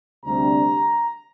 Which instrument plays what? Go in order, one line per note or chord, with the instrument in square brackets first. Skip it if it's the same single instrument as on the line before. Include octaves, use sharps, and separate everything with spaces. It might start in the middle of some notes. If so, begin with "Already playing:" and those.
[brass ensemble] D2 C3 G3 D4 A#5